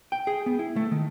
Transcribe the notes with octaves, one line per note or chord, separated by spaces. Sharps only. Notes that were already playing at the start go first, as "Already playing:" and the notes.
G5
G#4
B3
E4
A3
D#3